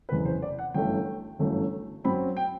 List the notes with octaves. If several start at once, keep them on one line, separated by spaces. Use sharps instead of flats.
F#1 E2 C3 E3 B4
C5
D5
F#5
G1 F#2 E3 A3 G5
G1 F#2 E3 A3
F#2 F#3 C4 B5
G5